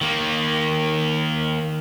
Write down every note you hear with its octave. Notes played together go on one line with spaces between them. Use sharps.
D#3 A#3